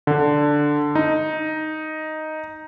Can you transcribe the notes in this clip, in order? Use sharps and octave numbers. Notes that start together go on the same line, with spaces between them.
D3
D#4